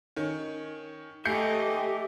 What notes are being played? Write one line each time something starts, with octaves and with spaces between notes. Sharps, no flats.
D#3 C#4
A3 G4 D#5 E5 G#5 G6 C7 C#7